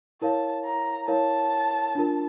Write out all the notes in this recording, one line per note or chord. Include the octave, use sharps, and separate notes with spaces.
E4 A#4 C#5 F5 A5
A#5
E4 A#4 C#5 F5 A5
D4 F4 A#4